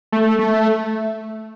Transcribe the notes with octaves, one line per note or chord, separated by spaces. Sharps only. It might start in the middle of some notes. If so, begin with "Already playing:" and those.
A3
A3